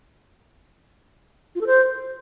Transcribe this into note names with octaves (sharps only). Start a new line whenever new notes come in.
F4
A4
C5